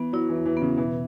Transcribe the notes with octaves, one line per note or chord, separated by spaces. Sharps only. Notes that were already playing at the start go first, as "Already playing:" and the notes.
Already playing: E3 B3
F#3 E4
E3
E2
E3
C#3 B3
B2 E3